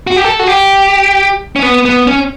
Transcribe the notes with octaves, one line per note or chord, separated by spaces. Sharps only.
F#4
G4
A4
F#4
G4
C#4
B3
B3
C#4